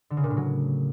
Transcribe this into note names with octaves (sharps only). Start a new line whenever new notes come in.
D3
C#3
A#2
A2
F#3